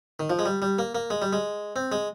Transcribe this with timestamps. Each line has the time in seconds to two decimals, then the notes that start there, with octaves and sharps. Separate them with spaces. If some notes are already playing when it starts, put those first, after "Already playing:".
0.20 D#3
0.30 F3
0.39 G#3
0.46 G3
0.62 G3
0.79 A#3
0.95 A#3
1.10 G#3
1.22 G3
1.33 G#3
1.76 C4
1.92 G#3